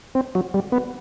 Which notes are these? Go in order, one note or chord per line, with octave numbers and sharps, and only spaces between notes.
C4
F#3
G3
B3